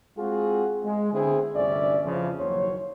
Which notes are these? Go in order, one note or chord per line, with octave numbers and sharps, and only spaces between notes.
G#3 C4 F4 F#4 G#4
G#3
D3 B3 C4 E4 G#4
G1 D2 C3 C#4 D5 E5
F2 C#3 E3 F3
F#1 D#2 F#3 C5 C#5